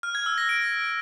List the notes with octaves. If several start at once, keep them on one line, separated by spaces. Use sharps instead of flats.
F6
G#6
E6
A#6
D7